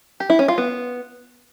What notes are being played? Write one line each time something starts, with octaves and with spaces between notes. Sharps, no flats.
G4
E4
C#4
F4
B3